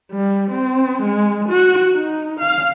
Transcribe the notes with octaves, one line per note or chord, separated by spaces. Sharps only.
G3
C4
G#3
F#4
D#4
F5